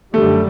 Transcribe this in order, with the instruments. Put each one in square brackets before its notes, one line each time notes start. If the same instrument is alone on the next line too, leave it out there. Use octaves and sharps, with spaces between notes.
[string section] F#2 D3 G3 [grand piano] A3